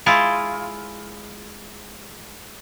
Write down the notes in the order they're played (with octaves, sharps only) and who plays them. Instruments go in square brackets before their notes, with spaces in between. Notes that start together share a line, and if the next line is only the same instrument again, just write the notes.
[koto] G#3 E4 F4